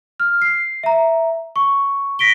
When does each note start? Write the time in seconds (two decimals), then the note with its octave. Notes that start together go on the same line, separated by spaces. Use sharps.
0.20 F6
0.42 C7
0.83 E5 A#5
1.56 C#6
2.19 A#6 B6 D7 G7